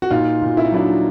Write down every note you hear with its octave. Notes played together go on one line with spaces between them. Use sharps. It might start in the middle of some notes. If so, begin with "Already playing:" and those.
F#4
A#2 D#4 F4
A#2
E4
D#4
F#3 D4 E4